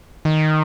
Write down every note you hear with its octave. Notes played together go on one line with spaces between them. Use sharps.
D#3